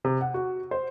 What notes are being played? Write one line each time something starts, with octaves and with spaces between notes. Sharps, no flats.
C3
F#5
F#4
C5